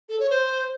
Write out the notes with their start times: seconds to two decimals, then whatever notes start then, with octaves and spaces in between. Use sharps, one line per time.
0.09 A4
0.20 C#5
0.30 C5